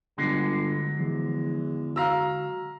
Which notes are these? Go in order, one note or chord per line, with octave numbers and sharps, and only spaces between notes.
G1 D3 F#3 G#3
E2 E3 F3
F#4 F5 A#5 E6